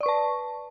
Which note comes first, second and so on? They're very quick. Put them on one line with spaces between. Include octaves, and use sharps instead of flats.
D5 C#6 B4 A5